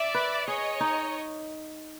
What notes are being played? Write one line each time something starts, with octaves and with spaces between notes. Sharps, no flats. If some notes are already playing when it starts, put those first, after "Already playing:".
Already playing: D5 E5
B4
G#4 C#5 D#5
D#4